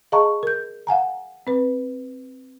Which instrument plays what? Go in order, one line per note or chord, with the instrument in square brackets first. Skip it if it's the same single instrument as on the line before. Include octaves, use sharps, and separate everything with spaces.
[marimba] G#4 D#5 F5 A5 A#5 C#6
A#4 G6
F5 F#5 G#5 A#5
C4 B4